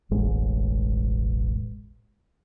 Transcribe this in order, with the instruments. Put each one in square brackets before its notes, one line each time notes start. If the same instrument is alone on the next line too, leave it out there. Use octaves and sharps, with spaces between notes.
[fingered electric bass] E1 A1 G#3